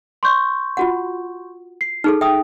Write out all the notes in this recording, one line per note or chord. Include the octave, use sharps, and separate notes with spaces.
C6 C#6 G6
F4 F#4 F#5
C7
D#4 G#4 A4 F6
E5 G5 D#6